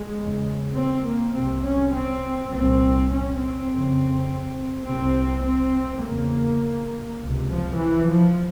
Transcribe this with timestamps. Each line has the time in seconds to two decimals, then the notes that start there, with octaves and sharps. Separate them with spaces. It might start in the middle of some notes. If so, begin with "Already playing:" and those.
Already playing: G#3
0.18 E2 C#3
0.75 C4
1.04 A#3
1.34 C2 C3 C4
1.64 C#4
1.93 C4
2.52 C2 A#2 C4
3.11 C#4
3.40 C4
3.69 F2 C#3
4.86 C2 C3 C4
5.44 C4
6.04 E2 C#3 A#3
7.21 C#2 C3
7.51 F3
7.80 E3
8.09 F3